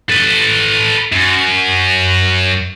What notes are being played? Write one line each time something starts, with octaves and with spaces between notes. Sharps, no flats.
A4 B4
F#2